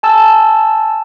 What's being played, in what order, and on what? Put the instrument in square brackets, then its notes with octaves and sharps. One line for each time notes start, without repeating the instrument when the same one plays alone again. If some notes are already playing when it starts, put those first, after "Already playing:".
[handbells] G#5 A5 E6